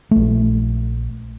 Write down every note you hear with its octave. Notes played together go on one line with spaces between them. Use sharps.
A#1 A3